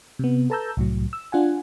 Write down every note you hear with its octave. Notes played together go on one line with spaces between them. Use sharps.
C3 B3
A4 B4 A5 A#5 E6 G6
C2 A2 F#3
E6
D4 F4 F#5 G#5